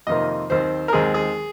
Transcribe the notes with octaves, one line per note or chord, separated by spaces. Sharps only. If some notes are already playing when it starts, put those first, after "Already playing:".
F2 C3 D#3 A#3 D#5
D#2 D#3 C4 C5
A#4
D#2 D#3 G#3 C4 G#4
G#4